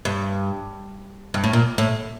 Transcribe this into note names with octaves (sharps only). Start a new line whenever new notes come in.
G2
G2
A2
A#2
A2